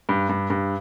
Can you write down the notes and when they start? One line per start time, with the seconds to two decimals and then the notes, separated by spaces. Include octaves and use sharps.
0.09 G2
0.29 G2
0.50 G2